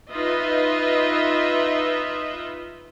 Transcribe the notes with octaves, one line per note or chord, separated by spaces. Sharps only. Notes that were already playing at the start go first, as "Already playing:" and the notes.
D#4 F4 B4 D#5 E5